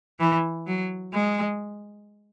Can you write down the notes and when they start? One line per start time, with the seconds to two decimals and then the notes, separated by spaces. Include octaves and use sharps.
0.20 E3
0.67 F#3
1.13 G#3